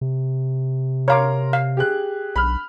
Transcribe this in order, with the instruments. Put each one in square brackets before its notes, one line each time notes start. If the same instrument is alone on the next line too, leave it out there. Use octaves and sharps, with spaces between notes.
[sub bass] C3
[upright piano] A#4 A#5 C6 [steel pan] C#5 F5 D6
[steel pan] F5
[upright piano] G4 G#4 F#6
[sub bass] B1 [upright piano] B5 F6